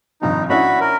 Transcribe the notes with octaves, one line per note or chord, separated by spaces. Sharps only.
G#1 G2 F3 D#4
C#4 D4 E4 F#4 B5
A#4